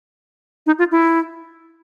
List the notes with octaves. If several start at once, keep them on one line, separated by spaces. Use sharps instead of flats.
D#4
F4
E4